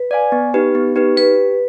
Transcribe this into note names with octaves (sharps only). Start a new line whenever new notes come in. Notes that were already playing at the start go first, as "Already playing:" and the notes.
Already playing: B4
D5 F5 G#5
B3
D#4 G4 B4
B3
D#4 G4 B4
G4 B4